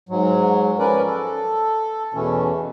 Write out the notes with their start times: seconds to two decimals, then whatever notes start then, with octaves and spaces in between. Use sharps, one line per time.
0.09 G#2 F#3
0.79 F3 C#4 A#4 B4 D5
1.06 A4
2.14 E2 B2 E3 A3 C#4